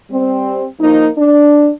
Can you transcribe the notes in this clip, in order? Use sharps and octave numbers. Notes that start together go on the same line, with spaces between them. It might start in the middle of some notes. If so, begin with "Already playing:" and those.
G3 C4
F3 A#3 D#4
D4